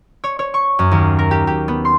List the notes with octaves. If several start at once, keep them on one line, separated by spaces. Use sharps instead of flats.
C#5
C#5
C#6
F#2
D#2
A#4
G4
G4
B3
C6